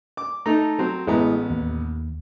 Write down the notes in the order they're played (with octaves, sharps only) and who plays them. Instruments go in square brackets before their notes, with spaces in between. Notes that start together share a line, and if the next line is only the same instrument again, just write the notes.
[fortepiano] D6
[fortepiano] A3 D#4 [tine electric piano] A4 A#5
[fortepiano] F#3 C4
[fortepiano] A1 B3 A#5 [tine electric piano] G#3 E4 G#4
[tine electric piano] D#2